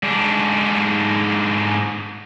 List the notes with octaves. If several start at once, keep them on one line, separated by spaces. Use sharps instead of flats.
G#2 D4